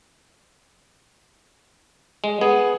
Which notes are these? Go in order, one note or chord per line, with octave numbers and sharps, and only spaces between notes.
G#3
B3 G#4